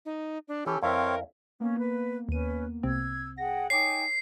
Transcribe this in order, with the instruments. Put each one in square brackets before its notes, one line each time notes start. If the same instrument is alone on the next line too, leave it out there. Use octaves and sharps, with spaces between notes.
[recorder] D#4
D4
[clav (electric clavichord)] E3 [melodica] C#4 A4 [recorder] G4
[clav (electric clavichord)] F2 E4 [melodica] C4 C#5 F5 [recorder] A#4
[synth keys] A#3 B3 [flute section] C#4
[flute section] B4
[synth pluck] D#2 D#7 [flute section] C#4 B4
[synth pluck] C2 C3 C4 [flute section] E6 G#6
[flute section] G#4 F#5 G5 [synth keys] A#6
[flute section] D#4 G5 G#5 [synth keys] C#5 D6 D#6 [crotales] C7